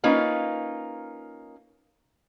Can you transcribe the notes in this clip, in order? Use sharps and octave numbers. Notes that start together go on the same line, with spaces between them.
A#3 C#4 D#4 F4 B4